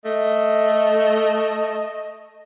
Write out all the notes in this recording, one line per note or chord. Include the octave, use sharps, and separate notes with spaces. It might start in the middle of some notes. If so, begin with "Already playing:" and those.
A3 D#5